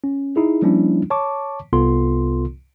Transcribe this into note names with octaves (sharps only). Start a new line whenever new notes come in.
C#4
D#4 E4 G#4
F3 G3 A#3 C#4 D4 E4
C#5 A5 C#6 D6
C2 C3 B3 F4 A4 C6